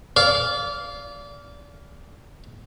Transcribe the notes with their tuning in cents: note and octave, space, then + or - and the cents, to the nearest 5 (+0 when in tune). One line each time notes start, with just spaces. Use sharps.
D5 -30 F5 +0